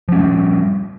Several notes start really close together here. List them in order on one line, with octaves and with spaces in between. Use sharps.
F3 C#4 G#3 G3